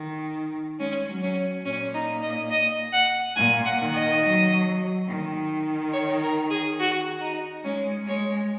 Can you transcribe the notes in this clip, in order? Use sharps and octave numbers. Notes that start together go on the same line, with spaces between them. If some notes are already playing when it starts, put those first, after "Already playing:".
Already playing: D#3
G#3 C#4
F#3
C#4
A#2 C#4
D#4
D#5
D#5
F#5
A#2 G#5
F#5
D#3
D#5
F#3
D#3
C#5
A#4
G#4
F#4
D#4
G#3 C#4
G#3 C#5